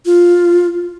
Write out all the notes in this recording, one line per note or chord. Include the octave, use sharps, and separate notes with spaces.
F4